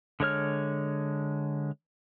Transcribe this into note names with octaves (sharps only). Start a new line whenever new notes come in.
D3 G#3 C#5 F6